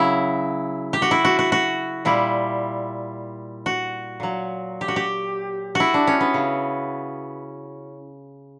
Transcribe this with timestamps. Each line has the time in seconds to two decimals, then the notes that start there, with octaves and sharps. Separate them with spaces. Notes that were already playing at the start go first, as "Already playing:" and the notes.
Already playing: C#3 F#3 E4
0.93 G4
1.02 F#4
1.11 E4
1.25 F#4
1.39 F#4
1.52 F#4
2.05 A#2 G3 E4
3.66 F#4
4.20 A#2 F#3
4.81 G4
4.88 F#4
4.96 G4
5.75 E4 F#4
5.94 D4
6.07 C#4
6.21 B3
6.34 C#3